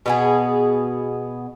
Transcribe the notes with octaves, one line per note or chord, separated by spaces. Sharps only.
B2 B3 G#4